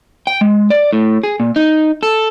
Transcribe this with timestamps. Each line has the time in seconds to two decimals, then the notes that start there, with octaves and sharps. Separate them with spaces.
0.27 G5
0.41 G#3
0.70 D5
0.93 A2
1.23 G#4
1.40 A#2
1.56 D#4
2.03 A4